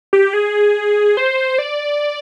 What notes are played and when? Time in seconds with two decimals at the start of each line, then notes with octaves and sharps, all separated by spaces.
0.13 G4
0.33 G#4
1.17 C5
1.59 D5